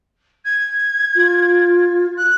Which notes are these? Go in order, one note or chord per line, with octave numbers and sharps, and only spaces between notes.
G#6
F4
F#6